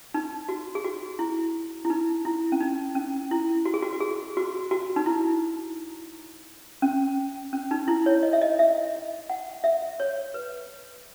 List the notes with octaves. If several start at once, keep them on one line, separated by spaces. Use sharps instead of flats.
D#4
F#4
G#4
F#4
E4
E4
D#4
E4
C#4
D#4
C#4
E4
F#4
G#4
F#4
F#4
G#4
F#4
F#4
D#4
E4
C#4
C#4
D#4
E4
C#5
D#5
E5
D#5
E5
F#5
E5
C#5
B4